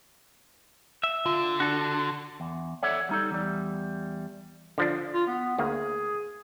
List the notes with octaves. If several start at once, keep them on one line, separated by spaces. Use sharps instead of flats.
E5
D3 F4
D4 F#4 A4
E2
A4 C#5 D5 E5 F#5
G3 D#4 A4
E2 G3
D3 F3 D4
F4
B3
D2 A#3 G#4